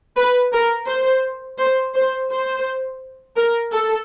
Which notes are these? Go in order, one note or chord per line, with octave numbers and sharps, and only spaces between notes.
B4
A#4
C5
C5
C5
C5
A#4
A4